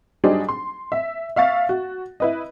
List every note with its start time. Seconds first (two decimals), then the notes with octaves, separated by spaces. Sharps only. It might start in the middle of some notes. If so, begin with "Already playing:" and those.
0.24 F#3 G3 D4 D#4 G#4 C5
0.49 C6
0.92 E5
1.36 E5 F5 C#6 A6
1.69 F#4
2.20 E4 B4 D#5